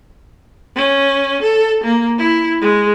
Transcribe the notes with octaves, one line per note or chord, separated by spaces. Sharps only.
C#4
A4
A#3
E4
G#3